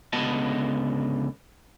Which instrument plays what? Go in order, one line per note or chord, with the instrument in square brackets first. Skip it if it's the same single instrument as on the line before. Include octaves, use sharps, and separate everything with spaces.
[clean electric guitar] C#2 D3 B3 D#5 A5